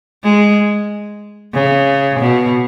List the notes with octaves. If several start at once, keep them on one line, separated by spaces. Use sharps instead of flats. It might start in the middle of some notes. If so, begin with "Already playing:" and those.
G#3
C#3
B2